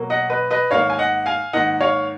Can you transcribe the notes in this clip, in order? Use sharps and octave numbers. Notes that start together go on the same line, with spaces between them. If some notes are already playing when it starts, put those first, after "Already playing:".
Already playing: B2 F#3 A#3
D#5 F#5
B4 D#5
B4 D#5
G#2 D#3 A#3 C#5 F5
G#5
D#5 F#5
F5 G#5
G#2 D#3 A#3 D#5 F#5
C#5 F5